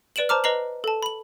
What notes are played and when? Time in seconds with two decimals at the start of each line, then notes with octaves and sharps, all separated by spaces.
0.16 B4 D5 D7 E7 F#7
0.29 C5 A5 A#5 D6 F6
0.44 B4 D#5 A#5 C7 F#7
0.84 A4 A5
1.03 B5 F#7